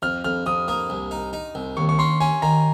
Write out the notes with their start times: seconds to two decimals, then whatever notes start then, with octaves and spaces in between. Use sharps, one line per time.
0.02 F2 F6
0.24 F2 F6
0.46 F2 D#6
0.68 A#3 D#6
0.90 C2
1.11 D#4
1.33 D#4
1.55 C2
1.77 D#2 C#6
1.89 C#6
1.99 C#4 C6
2.20 C#4 G#5
2.42 D#3 A#5